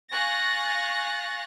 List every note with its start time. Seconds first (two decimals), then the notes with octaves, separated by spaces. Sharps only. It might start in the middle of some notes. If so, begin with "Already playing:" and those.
0.11 F5 G#5 C#6 F#6 A6 A#6